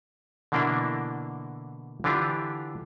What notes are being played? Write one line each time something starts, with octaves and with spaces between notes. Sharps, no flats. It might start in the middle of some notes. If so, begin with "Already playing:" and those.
B2 D3 E3 A#3 D4 E4
D3 E3 D4 F4 G4